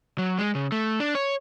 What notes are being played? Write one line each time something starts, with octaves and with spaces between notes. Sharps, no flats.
F#3
G#3
C#3
A3
D4
C#5